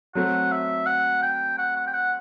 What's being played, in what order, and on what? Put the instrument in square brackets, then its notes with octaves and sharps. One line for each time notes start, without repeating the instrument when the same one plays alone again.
[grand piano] F#3 A3 C4 [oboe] F#5
[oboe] E5
F#5
G5
F#5
F#5
G5
F#5